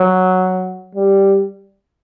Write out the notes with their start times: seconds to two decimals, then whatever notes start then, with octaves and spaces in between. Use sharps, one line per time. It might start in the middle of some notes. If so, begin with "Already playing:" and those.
Already playing: F#3
0.95 G3